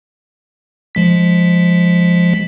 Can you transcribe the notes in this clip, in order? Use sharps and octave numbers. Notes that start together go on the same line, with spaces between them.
F3 G#3 B6